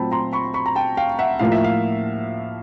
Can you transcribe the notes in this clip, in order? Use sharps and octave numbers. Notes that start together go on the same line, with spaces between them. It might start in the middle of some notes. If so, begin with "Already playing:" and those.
Already playing: A#2 F#3 A3 C4 A5 B5
A#5 C6
B5 C#6
B5 C#6
A#5
G5 A5
F5 G5
E5 F#5
A2 F3 A#3 F5
E5
F5